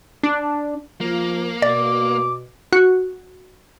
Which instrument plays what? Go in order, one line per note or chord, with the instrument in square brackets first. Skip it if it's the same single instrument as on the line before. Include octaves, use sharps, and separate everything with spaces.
[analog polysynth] D4
[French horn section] F3 F4 [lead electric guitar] A#3
[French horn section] B2 [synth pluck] D5 [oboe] D6
[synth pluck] F#4